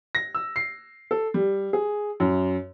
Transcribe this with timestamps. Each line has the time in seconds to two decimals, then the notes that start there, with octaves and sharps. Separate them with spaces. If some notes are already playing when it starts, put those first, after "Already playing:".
0.15 A#6
0.35 E6
0.56 C7
1.11 A4
1.34 G3
1.73 G#4
2.20 F#2